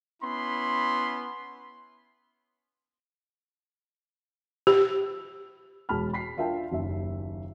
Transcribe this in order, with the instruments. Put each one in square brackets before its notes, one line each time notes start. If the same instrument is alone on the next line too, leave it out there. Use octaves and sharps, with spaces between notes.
[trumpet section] B3 C#4 E4 B5 C6
[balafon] G4
[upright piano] E1 G#3 A5 B5 F6
B5 B6 C7
D4 F4 A#4 E5 G5 A5
F#1 D#2 E5